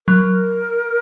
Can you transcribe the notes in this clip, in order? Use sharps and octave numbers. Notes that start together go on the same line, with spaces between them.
F#3 A#4